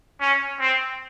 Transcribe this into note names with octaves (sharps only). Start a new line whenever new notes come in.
C#4
C4